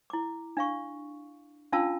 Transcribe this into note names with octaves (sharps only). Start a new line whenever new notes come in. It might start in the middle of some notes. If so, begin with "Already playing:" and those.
E4 D6
D4 F5 C#6
C#4 D4 F4 F5 A5 E6